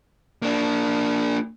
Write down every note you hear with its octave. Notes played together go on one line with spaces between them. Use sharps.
A#3 D4